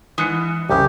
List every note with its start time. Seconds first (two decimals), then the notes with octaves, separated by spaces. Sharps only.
0.18 G#2 E3 D#6 F#6 C#7
0.70 C2 F#2 C#3 G4